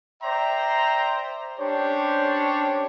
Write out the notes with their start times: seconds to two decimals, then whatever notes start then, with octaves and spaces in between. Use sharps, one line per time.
0.23 C5 D5 E5 G5 A#5 C6
1.60 C#4 D4 G4 C5 C#5